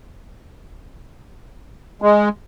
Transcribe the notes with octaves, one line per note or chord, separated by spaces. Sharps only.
G#3